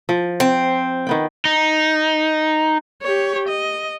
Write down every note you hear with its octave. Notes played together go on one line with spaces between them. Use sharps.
F3
C4
D#3 B3 G5
D#4
G4 C#5
D#5